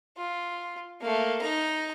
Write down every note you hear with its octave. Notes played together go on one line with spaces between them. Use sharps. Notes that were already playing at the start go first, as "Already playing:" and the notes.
F4
A3 A#3
D#4 A#5